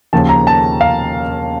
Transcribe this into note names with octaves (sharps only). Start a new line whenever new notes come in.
D#2 C#3 F3 A#3 A5
A#5
A5
F5